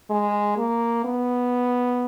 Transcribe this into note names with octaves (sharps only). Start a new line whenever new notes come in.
G#3
A#3
B3